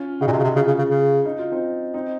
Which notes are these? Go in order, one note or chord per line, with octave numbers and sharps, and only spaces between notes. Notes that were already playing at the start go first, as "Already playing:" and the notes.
Already playing: C#4 F4
C#3 D#4 F#4
A#2
C3
C#3
C3
C#3 C#4 F4
C#3
C#3
C#3
D#4
F4
C4 D#4
C4 D#4